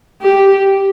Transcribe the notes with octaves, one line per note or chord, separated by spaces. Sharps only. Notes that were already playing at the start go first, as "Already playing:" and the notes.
G4